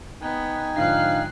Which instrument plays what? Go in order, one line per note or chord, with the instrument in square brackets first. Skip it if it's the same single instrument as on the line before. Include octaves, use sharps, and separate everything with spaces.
[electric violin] B3 [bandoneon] D#4 G5 G#5
[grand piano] G#2 D3 F3 [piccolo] F5 [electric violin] F#6 C7